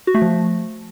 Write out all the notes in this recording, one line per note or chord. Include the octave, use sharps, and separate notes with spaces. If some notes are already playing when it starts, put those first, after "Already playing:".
F#4
A3
F3